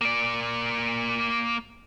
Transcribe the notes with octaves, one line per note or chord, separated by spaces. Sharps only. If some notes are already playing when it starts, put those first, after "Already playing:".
A#3 D5